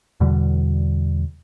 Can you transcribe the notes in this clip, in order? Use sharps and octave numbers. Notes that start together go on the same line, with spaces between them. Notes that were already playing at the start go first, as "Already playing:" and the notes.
E2 B2 D3 G3